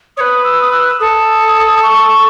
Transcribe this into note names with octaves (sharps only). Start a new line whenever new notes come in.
B4 C#5 D#6
E6
D#6
E6
E6
A4 D#6
C#6